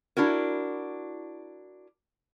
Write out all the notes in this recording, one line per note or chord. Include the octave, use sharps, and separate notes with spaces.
D4 E4 F#4 A#4